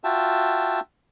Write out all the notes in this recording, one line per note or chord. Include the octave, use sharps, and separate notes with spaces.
F4 F#4 E5 G5 A5